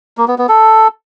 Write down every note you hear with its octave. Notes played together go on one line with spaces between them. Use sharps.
A#3
B3
B3
A4